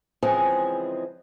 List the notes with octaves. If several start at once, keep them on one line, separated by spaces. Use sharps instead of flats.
C#3 E3 F3 G#3 C4 G#4